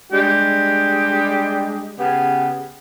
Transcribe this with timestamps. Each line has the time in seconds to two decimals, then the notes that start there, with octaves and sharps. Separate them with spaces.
0.12 G3 G#3 D4 G4
1.99 C#3 B3 G4 G#4